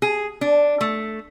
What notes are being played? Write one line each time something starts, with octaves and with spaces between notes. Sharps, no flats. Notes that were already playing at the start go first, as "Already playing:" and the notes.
G#4
D4
A3